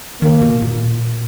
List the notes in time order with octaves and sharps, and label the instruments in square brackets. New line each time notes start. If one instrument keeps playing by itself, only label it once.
[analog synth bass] D#3 [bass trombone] A#3
[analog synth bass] B2
A#2